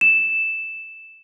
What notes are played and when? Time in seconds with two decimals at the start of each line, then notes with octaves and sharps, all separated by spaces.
0.01 E7